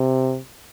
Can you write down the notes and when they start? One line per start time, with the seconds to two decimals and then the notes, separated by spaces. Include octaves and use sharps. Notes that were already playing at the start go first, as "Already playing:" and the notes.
Already playing: C3